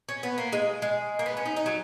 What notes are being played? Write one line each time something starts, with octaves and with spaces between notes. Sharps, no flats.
C#4
B3
A#3
G#3
G#3
A#3
B3
C#4
D#4
D#4
F#3